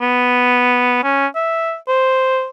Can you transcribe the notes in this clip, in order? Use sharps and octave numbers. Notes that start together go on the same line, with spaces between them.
B3
C#4
E5
C5